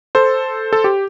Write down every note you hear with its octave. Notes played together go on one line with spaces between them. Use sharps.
A4 C5
A4
G4